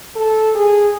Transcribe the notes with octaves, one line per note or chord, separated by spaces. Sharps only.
A4
G#4